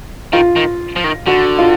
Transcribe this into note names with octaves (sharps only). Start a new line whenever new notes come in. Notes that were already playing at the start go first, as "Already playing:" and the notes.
D#3 F4
D#3
F3
D#3
D3 F#4
F4